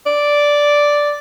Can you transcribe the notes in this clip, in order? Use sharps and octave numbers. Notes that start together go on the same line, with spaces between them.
D5